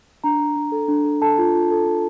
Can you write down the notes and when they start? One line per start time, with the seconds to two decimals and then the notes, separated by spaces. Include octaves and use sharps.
0.24 D4 A#5
0.39 D4
0.56 D4
0.72 A4
0.88 D4
1.04 A4
1.22 A4 A5
1.38 F4
1.54 F4
1.71 A4
1.86 D4